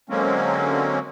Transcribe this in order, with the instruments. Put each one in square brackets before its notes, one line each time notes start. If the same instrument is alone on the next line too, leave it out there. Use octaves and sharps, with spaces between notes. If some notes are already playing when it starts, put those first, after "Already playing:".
[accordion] D3 F#3 G#3 A#3 C4 C#4